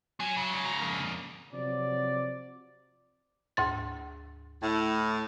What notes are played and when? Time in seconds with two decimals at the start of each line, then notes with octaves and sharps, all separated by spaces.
0.20 F#3 C#4 G#5
0.37 G#2 C#3
0.65 A#5
0.81 F2 A#3
1.53 C3 F3 F#3 D5
3.57 D2 G#2 A6
4.62 A2